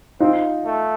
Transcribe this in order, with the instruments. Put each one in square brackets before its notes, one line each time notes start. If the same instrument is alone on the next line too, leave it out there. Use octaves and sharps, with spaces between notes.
[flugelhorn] C4 [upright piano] D#4 F4
[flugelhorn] A3